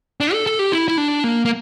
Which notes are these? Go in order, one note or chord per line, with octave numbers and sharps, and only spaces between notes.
D4
A4
A4
G4
E4
E4
D4
A#3
A#3